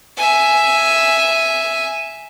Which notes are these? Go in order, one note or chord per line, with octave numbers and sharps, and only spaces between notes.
E5 G#5